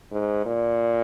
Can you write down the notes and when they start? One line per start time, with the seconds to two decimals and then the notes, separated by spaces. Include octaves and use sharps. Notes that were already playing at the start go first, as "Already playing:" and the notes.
0.12 G#2
0.46 A#2